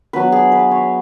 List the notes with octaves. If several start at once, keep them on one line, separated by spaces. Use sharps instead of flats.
F#3 B3 D4 B4
G#4
B4
C#5